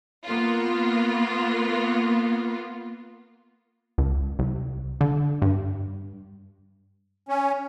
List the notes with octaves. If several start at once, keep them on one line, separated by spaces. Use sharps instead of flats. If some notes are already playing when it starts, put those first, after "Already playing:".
A#3 B3 F4
C#2
C2
D3
G2
C#4